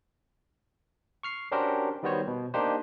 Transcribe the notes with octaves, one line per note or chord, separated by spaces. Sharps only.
C#6 F6 C7
C#4 D4 F#4 G4 A#4 C5
D#3 G3 B3 F#4 C5 C#5
B2
A#3 D4 D#4 G4 C5